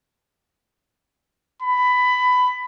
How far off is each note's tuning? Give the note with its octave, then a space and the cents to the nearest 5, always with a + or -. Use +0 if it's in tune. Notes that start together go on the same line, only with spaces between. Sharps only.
B5 +15